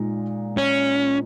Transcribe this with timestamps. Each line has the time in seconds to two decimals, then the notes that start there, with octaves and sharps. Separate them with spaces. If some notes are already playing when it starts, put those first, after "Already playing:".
Already playing: A#2 G#3 D#4
0.57 C#4